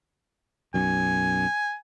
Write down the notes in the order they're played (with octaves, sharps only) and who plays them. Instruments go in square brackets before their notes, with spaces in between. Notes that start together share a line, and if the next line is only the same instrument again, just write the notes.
[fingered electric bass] B1 F#2 [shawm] G#5